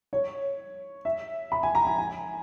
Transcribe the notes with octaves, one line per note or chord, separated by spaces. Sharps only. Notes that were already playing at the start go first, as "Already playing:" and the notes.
C#5
E5
B5
G#5
A#5
G#5
G#5